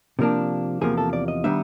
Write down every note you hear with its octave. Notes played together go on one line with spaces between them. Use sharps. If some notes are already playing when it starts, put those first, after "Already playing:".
C3 F3 A#3 D4
E2 C3 F3 A#3 G#4
A4
D5
D#5
D#3 G3 B3 D4 E5